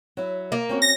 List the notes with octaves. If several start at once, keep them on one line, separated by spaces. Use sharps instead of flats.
F#3 E4
A#3
C4 C#4 F#4
A#6